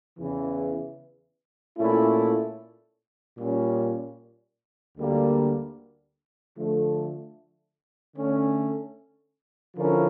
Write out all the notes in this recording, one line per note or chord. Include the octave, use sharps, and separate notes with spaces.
E2 C#3 E3
A#2 A3 C#4 E4
A#2 G3 C#4
D2 D3 G3 A#3
D3 F3 A3
D3 A3 C#4
D3 F3 C#4 E4 A#4